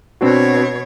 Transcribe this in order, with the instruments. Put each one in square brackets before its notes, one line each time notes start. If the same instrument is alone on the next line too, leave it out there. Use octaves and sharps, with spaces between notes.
[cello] B2 C#5 [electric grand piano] C4 D4 F#4